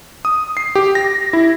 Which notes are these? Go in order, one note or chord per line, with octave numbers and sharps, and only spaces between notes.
D#6
C7
G4
A#6
E4